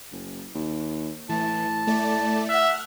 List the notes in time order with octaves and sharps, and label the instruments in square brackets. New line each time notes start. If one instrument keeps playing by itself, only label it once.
[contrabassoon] F#1
D#2
[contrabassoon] A2 [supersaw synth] E3 [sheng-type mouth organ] A5
[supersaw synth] A3 D5
[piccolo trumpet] E5 [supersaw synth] F#5 F6 F#6